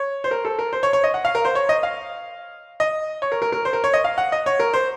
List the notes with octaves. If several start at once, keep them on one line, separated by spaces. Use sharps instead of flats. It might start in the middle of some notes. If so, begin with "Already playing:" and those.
Already playing: C#5
C5
A#4
A4
A#4
C5
C#5
C#5
D#5
F#5
F5
A#4
C5
C#5
D#5
F5
D#5
C#5
A#4
A#4
A#4
C5
A#4
C#5
D#5
F5
F#5
D#5
C#5
A#4
C5